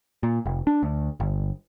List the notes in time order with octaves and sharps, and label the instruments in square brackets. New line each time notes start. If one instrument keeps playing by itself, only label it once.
[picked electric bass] A#2
F1
D4
D2
G1